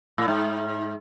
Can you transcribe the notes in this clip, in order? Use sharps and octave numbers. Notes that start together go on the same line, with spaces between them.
A2
G#2